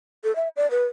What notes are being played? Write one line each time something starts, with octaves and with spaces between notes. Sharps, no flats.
A4
E5
D5
B4